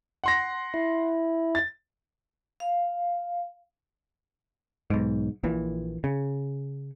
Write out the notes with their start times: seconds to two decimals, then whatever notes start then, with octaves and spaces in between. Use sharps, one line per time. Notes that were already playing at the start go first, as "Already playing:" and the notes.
0.24 F#5 C6 A#6
0.74 E4
1.55 A6
2.60 F5
4.90 B1 G#2
5.43 A#1 A#2 E3
6.04 C#3